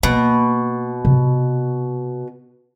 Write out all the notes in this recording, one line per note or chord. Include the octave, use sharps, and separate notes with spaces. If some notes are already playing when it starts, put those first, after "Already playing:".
B2 A#3
C3